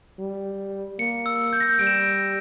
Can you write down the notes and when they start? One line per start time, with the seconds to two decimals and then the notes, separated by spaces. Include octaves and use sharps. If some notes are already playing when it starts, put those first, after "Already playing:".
0.19 G3
0.99 A#3 C#7
1.26 E6
1.53 G6
1.60 A#6
1.69 G6
1.79 G3 D7
1.87 E7
1.95 D7